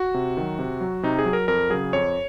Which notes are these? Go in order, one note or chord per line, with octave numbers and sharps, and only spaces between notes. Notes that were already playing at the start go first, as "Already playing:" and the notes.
Already playing: F#4
C3
D#3 F#3
C3
F#3
C3 D#4
G#4
F#3
A#4
F2 A#4
C#3 F#3 G#4
F2 C#5